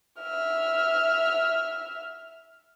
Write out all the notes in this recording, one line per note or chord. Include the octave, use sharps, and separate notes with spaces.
E5 F6